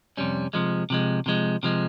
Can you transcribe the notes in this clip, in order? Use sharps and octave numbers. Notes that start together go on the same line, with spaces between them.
F2 C3 G3 C#4
C3 F3 G#3
C3 F3 G#3
C3 F3 G#3
C3 F3 G#3